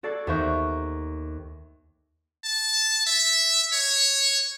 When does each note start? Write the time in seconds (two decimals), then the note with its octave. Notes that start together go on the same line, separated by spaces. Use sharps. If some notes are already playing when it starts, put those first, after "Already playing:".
0.03 F#4 A4 D5 G#6 C7
0.27 D#2 B3 C5 E5 C#6 G6
2.44 A5
3.07 E5
3.72 C#5